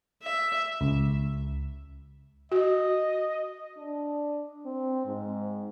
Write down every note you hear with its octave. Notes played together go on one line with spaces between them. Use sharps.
E5
C#2
F#4 D#5
D4
C4
G#2